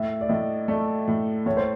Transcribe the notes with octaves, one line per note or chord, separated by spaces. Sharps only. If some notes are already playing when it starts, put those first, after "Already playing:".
Already playing: A2 E5
D5
A2 D#5
A3 D5
A2
A2 C#5
C5